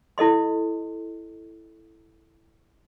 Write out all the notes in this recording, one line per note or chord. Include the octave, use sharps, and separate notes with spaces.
E4 A4 D#5 C6